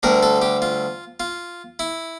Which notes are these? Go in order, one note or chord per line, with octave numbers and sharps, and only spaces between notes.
D2 D3 G3 A#4
A4
G4
F4
F4
E4